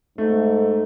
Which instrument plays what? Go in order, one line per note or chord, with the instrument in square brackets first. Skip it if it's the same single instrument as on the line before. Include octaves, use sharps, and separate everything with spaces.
[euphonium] G#2 [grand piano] A3